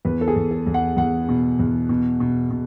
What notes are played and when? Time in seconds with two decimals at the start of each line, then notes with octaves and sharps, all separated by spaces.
0.05 E2 B4
0.21 A4
0.28 G#4
0.36 E2
0.51 A4
0.67 E2
0.74 F#5
0.97 E2 F#5
1.29 B2
1.59 E2
1.89 B2
2.20 B2
2.51 B2